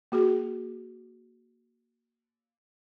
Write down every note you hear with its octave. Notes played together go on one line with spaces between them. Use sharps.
A#3 F#4 G#4